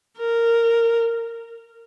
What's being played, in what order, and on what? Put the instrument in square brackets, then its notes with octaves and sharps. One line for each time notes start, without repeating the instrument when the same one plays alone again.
[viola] A#4